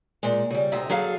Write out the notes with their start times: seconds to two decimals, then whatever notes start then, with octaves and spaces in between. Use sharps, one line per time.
0.23 A#2 G#3
0.50 C#3 G3
0.72 D2 C3 D#4 E5
0.90 F#3 G#4 A4 F5